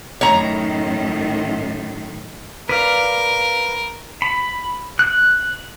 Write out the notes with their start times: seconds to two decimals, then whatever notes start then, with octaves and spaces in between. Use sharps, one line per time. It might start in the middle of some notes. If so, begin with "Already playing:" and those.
0.21 F#2 A2 D#3 C#5 A#5
2.69 A#4 B4 D5 F5
4.22 B5
4.99 F#6